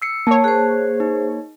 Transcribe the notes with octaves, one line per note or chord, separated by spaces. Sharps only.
E6 C7 C#7
A#3 C#5 A5
G#4 C5 F#6
D#4